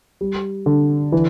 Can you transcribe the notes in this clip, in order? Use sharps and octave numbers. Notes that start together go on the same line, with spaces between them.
G3
D3
E3